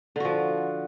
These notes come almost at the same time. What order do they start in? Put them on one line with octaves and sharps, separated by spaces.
D3 F#4 F3